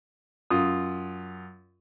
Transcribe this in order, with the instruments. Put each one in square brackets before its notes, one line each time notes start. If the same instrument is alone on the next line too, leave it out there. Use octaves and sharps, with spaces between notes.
[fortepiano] F#2 F4 D#6